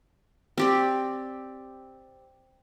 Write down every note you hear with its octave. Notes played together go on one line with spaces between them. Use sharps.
C4 G4 D5